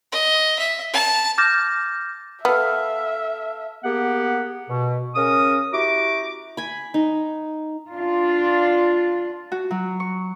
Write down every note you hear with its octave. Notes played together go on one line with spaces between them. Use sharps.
D#5
E5
A5
D6 F6 G6 A6 A#6 E7
B3 A4 E5 F5
A#3 B3 G4 G#4 F#5
B2
C#3 C#4 A#4 D#6
E4 F#4 G4 A#5 D6
G#5 B5
D#4
D4 F4
F#4
F#3
C#6